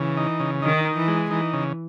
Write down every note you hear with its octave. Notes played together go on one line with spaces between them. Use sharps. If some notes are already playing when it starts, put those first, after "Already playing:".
Already playing: C#3 E3
D#4
C#3
D#3 D#4
D#4
E3
G#3
E3 D#4
C#3